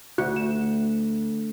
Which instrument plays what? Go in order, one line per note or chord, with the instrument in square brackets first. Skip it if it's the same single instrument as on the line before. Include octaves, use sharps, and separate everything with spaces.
[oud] D2 [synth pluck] F#4
[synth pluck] E7